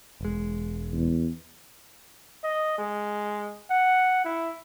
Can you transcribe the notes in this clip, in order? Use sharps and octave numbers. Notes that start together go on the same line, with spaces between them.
E1 G#3
E2
D#5
G#3
F#5
E4